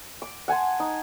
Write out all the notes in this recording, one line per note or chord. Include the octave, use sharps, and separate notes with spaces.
D6
F#5 G#5 A5 C6
D#4